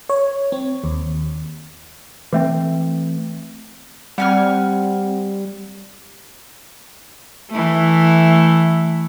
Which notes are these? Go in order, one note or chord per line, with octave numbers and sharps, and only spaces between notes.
C#5
C4
D#2
E3 A3 C4
G3 C4 F#5 G#5 F6
E3 A3